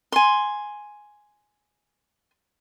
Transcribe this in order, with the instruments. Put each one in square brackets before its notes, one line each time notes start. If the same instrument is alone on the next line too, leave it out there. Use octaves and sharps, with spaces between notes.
[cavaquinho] G#5 C6